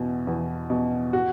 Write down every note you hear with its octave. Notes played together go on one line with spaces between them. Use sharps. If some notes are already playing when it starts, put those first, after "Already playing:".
Already playing: E2 B2
E2
B2
F#4